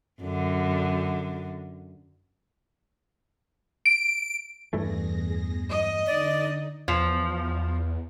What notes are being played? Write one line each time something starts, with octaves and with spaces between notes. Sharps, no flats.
F#2 D3
D7
E2 G2 E3 A3 G#4 A#6
D#5
D3 D#4 D5
E2 F3